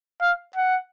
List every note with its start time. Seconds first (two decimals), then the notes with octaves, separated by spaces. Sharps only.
0.21 F5
0.56 F#5